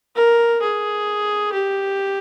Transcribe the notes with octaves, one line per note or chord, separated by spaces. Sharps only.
A#4
G#4
G4